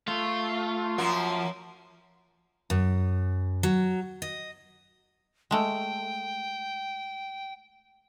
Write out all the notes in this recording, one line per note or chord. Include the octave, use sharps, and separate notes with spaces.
A3 F4
F#2 F3 A#3 F#4
F#2
F#3
D#5
G#3 A3 G5